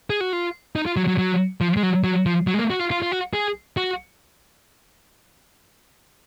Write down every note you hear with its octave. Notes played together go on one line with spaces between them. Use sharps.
G#4
F#4
F4
D#4
F4
F#3
F#3
F#3
F3
G#3
F#3
F#3
F3
F#3
G#3
A#3
F#4
F4
F4
F4
F#4
G#4
F#4